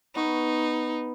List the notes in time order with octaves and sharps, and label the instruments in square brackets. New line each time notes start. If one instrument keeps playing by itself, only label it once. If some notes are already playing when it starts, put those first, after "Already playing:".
[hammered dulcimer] B3 C#6 [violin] D#4